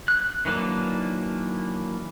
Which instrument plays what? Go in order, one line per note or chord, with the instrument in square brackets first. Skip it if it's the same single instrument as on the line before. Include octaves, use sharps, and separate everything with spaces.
[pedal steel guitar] F#6
D#3 E3 F#3 A#3 D4